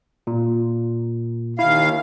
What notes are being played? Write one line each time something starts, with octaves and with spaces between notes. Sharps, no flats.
A#2
D#2 E4 F5